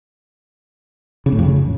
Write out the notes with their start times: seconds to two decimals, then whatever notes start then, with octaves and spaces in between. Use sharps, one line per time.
1.26 C#3
1.32 A2
1.39 F2
1.45 C#3